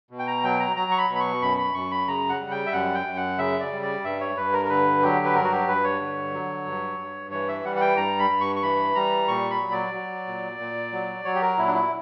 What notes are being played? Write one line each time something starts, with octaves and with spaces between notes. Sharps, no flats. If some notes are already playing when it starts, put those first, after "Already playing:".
B2
G5
A#5
F#3 G5
A#5
F#3 A#5
C#6
B5
B2
B5
C#6
F#2 B5
B5
F#2 C#6
B5
C#3 A#5
F#5
G3
G5
E5
F#2 F#5
G5
F#2
F#5
C#3 E5
D5
G3
D5
G2 E5
C#5
G2 B4
A#4
A#4
D3 B4
F#3 G4
B4
G2 A#4
F#4
G4
G2 B4
C#5
D3
F#3
G2
G2
E3 C#5
E5
G3 F#5
F#5
G5
G2 A#5
B5
G2
C#6
C#6
E3 B5
G3 A#5
A#2 C#6
B5
F#3
D5
F#3
A#2
A#2
F#3
F#3 C#5
G4
A#4
A#2 E4
D4
E4